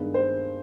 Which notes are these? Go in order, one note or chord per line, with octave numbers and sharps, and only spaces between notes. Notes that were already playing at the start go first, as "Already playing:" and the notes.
Already playing: G2 D#3 G#3 B3
C5